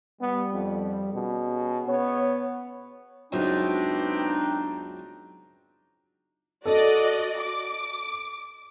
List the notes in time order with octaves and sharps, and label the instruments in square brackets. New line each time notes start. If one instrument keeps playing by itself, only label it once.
[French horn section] G3 [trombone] B3
[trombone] F2
[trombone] B2 [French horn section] C#4 G#4
[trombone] B3 [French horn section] C#5
[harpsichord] C#2 F#2 B2 [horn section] B3 C4 G5 [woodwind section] D4 D#4
[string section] F#4 D5 D#5 [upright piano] A4
[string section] D6